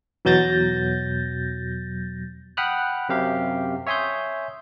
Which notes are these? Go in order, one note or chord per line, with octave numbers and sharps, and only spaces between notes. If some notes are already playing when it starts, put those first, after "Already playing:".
E2 B2 F#3 G6 A6 A#6
F#5 G5 B5 D#6 F6 F#6
F#2 C3 G4 F5
C#5 E5 G#5 C6 D#6 G6